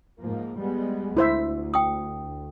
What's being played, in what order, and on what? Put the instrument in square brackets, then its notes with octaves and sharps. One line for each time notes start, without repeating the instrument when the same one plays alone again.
[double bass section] G#2 F3 A#3
G3 G#3 B3
[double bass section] D2 [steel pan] E4 C5 E5
[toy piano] G5 D#6